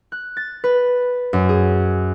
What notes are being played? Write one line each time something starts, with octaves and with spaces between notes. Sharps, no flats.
F#6
A6
B4
F#2
G#4